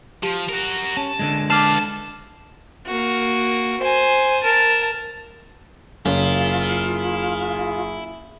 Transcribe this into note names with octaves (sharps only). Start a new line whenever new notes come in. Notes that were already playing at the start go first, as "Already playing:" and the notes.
F3 G4
F#4 A#4
C#4 A5
D3 G#3
B4 F5 A5 D6 F6 C7
A#3 F#4
C5 G#5
A#4 A5
F#1 E4 F4 G#4